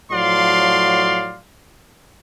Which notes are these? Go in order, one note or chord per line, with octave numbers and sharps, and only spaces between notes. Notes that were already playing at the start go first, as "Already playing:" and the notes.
A2 F3 F#3 D5 F5 C6